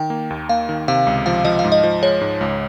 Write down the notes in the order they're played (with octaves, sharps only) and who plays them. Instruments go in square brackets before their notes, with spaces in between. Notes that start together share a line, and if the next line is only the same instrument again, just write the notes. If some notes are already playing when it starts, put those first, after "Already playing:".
Already playing: [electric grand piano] D#3 [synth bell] G5
[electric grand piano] A#3
D#2
[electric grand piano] A#3 [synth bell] F5
[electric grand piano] D#3
[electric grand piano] C3 [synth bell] F5
[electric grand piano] C#2
[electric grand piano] F3 [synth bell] F5
[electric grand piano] F3 [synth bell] D#5
[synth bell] F5
[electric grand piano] G#2
[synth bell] D#5
[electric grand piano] F3
[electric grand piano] G#3 [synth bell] C#5
[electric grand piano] G#2
C#2